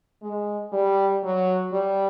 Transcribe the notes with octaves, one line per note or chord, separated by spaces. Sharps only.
G#3
G3
F#3
G3